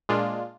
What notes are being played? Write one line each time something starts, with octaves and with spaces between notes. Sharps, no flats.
A#2 G#3 D4 F4